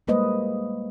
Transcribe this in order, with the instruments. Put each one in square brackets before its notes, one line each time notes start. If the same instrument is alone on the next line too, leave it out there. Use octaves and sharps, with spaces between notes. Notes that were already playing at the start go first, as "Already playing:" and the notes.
[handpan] G3 G#3 A#3 B4 C5 D#5